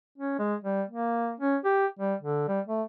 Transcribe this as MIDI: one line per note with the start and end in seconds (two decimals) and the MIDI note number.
0.18 0.38 61
0.39 0.55 56
0.64 0.82 55
0.89 1.34 58
1.40 1.56 61
1.64 1.86 67
1.99 2.14 55
2.21 2.48 50
2.48 2.60 55
2.67 2.83 57